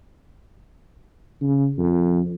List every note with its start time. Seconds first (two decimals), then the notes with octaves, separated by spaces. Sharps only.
1.42 C#3
1.78 F2